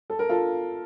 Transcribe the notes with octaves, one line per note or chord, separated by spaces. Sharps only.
A4
A#4
F4 A4